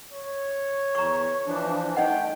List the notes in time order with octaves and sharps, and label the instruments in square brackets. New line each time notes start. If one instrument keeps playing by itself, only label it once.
[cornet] C#5
[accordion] E2 [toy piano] A#5 C#6
[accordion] E3 F3 D4
[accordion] A3 [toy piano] D#4 D#5 F#5 [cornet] G5